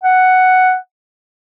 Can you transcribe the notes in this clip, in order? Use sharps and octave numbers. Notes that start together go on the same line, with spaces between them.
F#5